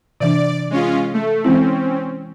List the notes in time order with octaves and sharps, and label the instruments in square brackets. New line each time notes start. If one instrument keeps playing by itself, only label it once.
[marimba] C3 E3 D4 [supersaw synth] D5
[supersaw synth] G#3 C#4 F4
A3
[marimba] E3 G#3 E4 [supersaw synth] C4 C#4